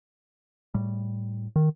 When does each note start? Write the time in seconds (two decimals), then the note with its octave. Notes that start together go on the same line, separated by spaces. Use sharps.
0.74 A2 G3
1.56 D#3